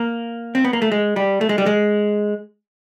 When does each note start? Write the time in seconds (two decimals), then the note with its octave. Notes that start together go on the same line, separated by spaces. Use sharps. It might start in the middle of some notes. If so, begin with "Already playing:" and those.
Already playing: A#3
0.55 C4
0.64 B3
0.73 A#3
0.82 A3
0.92 G#3
1.16 G3
1.41 A3
1.49 G#3
1.58 G3
1.66 G#3